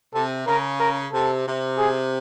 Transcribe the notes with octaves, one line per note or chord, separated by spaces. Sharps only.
C3 A4
C#3 A#4
A#4
C3 A4
C3
G#4